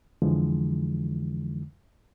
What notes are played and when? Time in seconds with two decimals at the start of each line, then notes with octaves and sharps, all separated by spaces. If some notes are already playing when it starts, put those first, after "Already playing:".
0.22 F2 D3 E3 F3 G#3